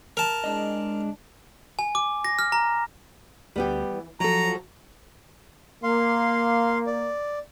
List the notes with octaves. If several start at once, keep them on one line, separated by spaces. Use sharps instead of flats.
A#4 A5
G#3 D4 D#5
G#5
D6
A#6
F6
A#5
D2 G3 B3 G4
E3
F3 F#3 A4 A#5
A#3 F5 C6
D5